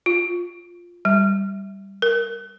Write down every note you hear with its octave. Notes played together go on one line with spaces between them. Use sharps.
F4
G3
A#4